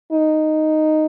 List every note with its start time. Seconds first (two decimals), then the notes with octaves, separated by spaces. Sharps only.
0.12 D#4